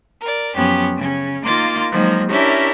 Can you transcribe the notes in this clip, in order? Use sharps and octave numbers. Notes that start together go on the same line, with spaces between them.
A#4 D5
F#2 F3 B3 C#4 G4
C#3 C#4
D#3 A#3 F4 C6 D6 A6
D#3 F3 F#3 G#3 A#3
C#4 D4 E4 G4 A#4 E5